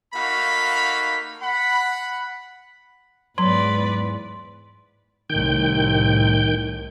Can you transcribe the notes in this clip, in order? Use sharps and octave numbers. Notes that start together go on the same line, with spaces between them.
A3 A#3 D#4 F#4 F5 B5
F#5 B5
E2 G#2 F#3 B4 D5 C6
C2 A2 D#3 G5 G6